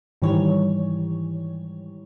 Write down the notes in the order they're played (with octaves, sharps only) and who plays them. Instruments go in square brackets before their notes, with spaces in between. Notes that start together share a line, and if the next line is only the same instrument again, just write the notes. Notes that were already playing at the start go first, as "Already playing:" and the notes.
[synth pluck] G#2 D#3 E3 G3 C#5